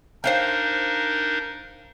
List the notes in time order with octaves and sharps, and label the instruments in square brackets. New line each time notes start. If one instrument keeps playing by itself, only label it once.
[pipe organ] D4 D#4 A#4 [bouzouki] C5 F5 G5